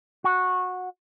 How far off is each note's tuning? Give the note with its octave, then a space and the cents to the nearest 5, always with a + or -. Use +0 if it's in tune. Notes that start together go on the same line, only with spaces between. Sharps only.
F#4 -15